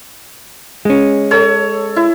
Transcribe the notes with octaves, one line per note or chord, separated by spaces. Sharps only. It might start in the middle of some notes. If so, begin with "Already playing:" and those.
G#3 C#4
A4 C#5
E4